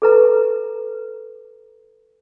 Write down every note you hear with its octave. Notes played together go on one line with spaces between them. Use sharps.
A4 B4 A#5